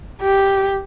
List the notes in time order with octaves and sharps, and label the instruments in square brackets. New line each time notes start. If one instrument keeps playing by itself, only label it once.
[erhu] G4